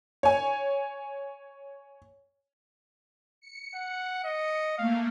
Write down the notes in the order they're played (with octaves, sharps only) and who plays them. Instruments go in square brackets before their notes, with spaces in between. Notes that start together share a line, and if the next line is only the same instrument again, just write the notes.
[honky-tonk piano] C#5 G#5
[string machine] C#7
[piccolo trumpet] F#5
D#5
[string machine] A3 A#3 [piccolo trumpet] F5